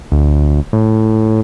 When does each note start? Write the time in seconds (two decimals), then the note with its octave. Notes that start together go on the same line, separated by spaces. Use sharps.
0.12 D2
0.73 A2